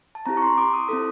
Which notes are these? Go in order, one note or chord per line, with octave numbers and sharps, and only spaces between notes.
A5
C4 E4 G4 A#5
C#6
C6
D6
D#6
C4 E4 A4 D#6